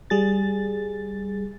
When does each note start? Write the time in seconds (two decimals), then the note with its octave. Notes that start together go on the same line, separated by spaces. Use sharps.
0.10 G3 G#4 A6